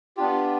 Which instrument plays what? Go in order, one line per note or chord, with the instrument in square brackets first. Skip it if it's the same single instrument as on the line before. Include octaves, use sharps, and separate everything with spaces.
[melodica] B3 D4 F4 G4